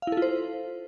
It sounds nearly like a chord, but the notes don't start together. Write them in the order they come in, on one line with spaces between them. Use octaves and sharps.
F5 E4 A4 F4 C5